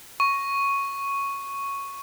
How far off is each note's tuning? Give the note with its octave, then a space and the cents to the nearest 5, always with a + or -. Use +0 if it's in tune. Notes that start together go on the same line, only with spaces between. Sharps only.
C#6 +0